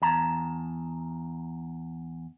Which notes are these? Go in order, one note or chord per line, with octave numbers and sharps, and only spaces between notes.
E2 A5 A#5